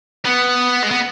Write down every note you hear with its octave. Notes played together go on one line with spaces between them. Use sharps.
B3
G#3
B3